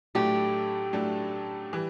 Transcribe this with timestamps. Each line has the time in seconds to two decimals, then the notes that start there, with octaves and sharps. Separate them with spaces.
0.15 A2 F#3 A3 D4 G4 A4
0.93 A2 F#3 A3 D4 A4
1.73 E3 G3